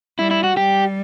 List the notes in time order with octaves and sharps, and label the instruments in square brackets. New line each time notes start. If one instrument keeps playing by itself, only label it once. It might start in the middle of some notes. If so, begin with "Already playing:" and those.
[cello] G3 [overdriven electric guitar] E4
[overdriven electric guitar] E4
F#4
[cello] G3 [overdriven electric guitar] G4